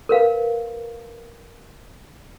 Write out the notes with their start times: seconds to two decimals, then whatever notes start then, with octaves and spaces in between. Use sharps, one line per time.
0.09 A#4 B4 F5